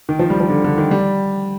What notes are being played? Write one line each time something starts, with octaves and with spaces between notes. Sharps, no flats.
D#3
F3
G3
F3
D3
D3
D#3
G3